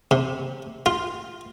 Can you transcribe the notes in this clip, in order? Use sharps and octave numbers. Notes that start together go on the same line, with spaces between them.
C3
F4